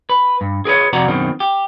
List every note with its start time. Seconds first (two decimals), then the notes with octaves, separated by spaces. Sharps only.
0.10 B4
0.41 G2
0.65 G#4 A#4 B4 C#5
0.93 F2 C3 F#4 D5 A#5
1.08 F#2 B2 D#3 C4
1.40 G4